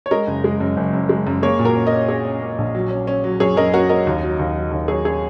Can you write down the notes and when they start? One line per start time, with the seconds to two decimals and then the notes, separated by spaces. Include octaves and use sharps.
0.06 C#5
0.11 G#3 A#4 D#5
0.27 F#1
0.44 G#3
0.60 F#2
0.77 F#1
0.93 F#2
1.09 G#3
1.27 F#2
1.43 A#3 G#4 C#5
1.59 A#2
1.65 F#4 A#4
1.76 C#4
1.87 A#4 D#5
1.92 C#4
2.08 C#4 G#4 C#5
2.25 C#4
2.42 A#3
2.58 A#1
2.75 F#3
2.91 C#4
3.07 C#4
3.24 F#3
3.40 F#2 G#4 C#5
3.57 F#2 A#4 D#5
3.73 C#4 F#4 A#4
3.89 C#4 A#4 D#5
4.07 D#2
4.23 F#3
4.39 D#2
4.55 F#3
4.71 D#2
4.88 F#3 G#4 C#5
5.05 C#4 G#4 C#5